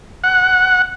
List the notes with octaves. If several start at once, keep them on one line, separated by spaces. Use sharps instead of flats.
F#5